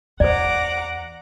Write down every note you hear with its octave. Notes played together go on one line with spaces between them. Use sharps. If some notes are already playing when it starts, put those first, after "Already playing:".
E2 C5 D5 F#5 A#5 D6